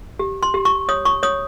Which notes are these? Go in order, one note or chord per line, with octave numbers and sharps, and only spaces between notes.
G4
C6
G4
C#6
C#5 D#6
C#6
C#5 D#6